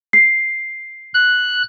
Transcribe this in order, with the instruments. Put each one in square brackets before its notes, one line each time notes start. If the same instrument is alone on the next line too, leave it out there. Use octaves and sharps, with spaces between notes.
[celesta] C7
[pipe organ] F#6